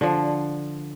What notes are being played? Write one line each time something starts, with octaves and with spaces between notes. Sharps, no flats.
D3 F3